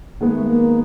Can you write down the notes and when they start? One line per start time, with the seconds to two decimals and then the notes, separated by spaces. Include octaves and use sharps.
0.20 D#3 G#3 A#3 B3
0.33 A3
0.45 A#3